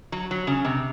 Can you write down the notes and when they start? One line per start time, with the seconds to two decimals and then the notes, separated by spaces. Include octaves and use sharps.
0.12 F#3
0.31 F#3
0.47 C#3
0.65 C3